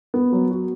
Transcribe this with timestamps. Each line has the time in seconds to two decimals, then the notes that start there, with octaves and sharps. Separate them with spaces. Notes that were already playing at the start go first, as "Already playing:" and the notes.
0.14 B3
0.33 F#3
0.51 F#4